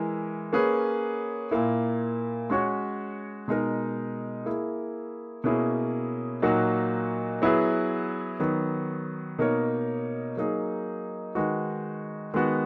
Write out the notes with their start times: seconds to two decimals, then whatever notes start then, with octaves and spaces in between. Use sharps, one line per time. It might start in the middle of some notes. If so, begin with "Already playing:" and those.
Already playing: E3 G#3 E4 A#4
0.53 A#3 C#4 G#4 B4
1.51 A#2 A#3 E4
2.50 G#3 C#4 F#4 C#5
3.48 B2 G#3 D#4 A#4
4.46 A#3 E4 G#4
5.44 B2 A#3 C#4 E4 G#4
6.42 A#2 F#3 A#3 D#4 F#4
7.42 F#3 B3 E4 G#4 B4
8.40 D#3 F#3 B3
9.38 B2 A#3 D#4 A#4 C#5
10.37 F#3 A#3 D#4 G#4
11.35 D#3 G#3 D#4 F#4 B4
12.34 D#3 G#3 B3 F#4